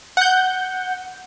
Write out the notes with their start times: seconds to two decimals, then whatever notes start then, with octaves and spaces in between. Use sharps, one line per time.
0.17 F#5 G6